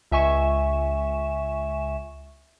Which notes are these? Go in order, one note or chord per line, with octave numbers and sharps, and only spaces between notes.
C#2 E5 G#5 C#6 E7